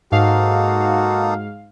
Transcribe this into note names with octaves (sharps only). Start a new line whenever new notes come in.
G#2 A#3 D#4 F#4 A4 F5